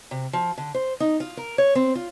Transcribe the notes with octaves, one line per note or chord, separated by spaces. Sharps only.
C3
F3
D3
C5
D#4
F4
A#4
C#5
C4
F4